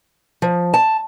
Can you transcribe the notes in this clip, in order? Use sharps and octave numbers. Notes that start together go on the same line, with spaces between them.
F3
A5